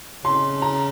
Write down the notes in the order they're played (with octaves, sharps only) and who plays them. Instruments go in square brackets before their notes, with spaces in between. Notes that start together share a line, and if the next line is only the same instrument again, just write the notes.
[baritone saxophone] C#3 [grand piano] C6
[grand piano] A#5